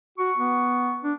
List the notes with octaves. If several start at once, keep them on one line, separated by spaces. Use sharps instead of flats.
F#4 C#6
B3
D4